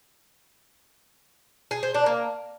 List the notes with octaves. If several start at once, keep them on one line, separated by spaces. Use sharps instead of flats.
G#4
C5
D4
A#3